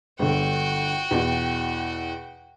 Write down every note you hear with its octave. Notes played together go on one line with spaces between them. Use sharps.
G1 D3 F#4 G5
E2 B2